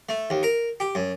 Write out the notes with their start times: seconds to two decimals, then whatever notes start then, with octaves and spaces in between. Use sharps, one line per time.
0.09 A3
0.30 D#2
0.43 A#4
0.80 G4
0.95 F#2